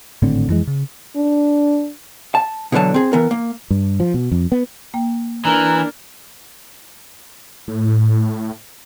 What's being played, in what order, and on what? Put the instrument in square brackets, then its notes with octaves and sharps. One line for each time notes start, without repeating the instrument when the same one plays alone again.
[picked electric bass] G#1 A2 D3 C4
F2 E3 G#3
C#3
[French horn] D4
[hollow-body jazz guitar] A5
B2 D3 E3 F#3 A5
C4 G#4
E3 B3 A#4
A#3
[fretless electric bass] G2
F3
B2
F2
B3
[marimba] A#3 G5
[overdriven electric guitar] E3 [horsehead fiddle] D4 A#4 [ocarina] A#5
[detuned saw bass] A2